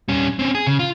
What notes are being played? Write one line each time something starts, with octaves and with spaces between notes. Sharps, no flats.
G3 C#4
C4 C#4
G#4
C#3
F4